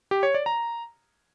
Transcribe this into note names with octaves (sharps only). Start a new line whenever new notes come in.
G4
C#5
D5
A#5